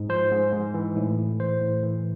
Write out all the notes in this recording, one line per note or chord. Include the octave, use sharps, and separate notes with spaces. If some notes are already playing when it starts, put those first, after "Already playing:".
Already playing: G#2
F3 C5
G#2
G#2
E3
A2
A2
E3 C5
A2
E3